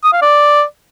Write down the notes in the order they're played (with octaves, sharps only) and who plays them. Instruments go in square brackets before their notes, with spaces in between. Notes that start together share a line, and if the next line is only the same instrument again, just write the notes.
[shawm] D#6
F5
D5